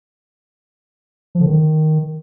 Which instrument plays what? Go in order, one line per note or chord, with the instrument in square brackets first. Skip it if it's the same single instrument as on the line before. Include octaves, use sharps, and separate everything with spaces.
[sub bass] F3
D3
D#3